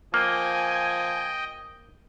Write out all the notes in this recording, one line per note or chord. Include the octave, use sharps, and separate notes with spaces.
F3 A#3 D#5 G5 G#5